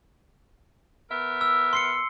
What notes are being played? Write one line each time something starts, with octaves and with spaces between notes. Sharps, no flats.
B3 A#4 E5
E6
C6 C7 C#7